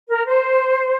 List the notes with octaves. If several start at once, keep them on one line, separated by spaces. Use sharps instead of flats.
A#4
C5